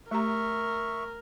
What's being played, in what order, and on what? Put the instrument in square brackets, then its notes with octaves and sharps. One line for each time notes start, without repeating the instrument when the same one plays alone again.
[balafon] A3 G4 A#5 [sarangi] A#4 [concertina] E5 C#6